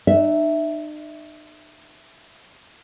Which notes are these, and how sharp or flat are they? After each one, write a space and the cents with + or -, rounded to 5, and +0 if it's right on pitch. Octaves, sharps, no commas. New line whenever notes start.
D#4 -45 E5 +0